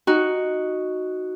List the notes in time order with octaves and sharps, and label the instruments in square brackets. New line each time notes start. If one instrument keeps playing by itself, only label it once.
[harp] D#4 F#4